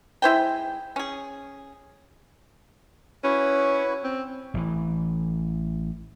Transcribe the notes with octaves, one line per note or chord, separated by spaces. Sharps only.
G#3 E4 C5 G5
C#4 G#4
C#4 E4 F#4 B4
C4
A1 E3